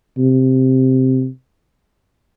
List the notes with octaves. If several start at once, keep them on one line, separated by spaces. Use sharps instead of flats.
C3